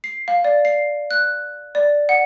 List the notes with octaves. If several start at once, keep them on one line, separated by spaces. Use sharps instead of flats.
C7
F5
D5
C7
F#6
D5
F#5